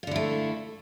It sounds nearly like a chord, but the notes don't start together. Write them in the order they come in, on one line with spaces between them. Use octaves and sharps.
F4 D3 E4 A3